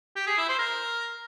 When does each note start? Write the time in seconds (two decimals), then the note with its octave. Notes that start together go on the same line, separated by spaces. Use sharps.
0.16 G4
0.27 G#4
0.38 E4
0.48 C5
0.59 A#4